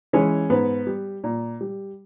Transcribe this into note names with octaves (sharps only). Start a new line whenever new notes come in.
E3 G#3 C#4 C#5
G#2 B3 B4
G3
A#2
G3